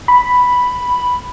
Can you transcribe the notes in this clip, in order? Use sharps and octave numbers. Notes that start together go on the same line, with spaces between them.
B5